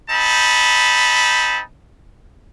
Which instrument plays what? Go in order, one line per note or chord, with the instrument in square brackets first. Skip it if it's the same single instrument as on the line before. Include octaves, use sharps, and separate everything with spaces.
[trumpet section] C4 D#4 A5 B5